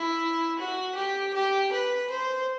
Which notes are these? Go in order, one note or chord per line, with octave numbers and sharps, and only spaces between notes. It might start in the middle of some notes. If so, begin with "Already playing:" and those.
Already playing: E4
F#4
G4
G4
B4
C5